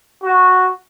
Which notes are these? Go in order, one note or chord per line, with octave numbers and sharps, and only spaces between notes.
F#4